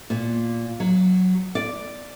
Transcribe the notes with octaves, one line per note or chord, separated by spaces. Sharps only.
A#2
F#3
D5